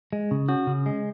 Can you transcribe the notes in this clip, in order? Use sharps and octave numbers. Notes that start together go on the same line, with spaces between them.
G#3
C#3
C#4 F#4
C#3
G#3